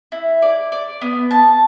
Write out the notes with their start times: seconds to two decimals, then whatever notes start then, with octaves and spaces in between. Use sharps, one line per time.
0.12 E4
0.42 D5
0.72 D5
1.01 B3
1.31 A5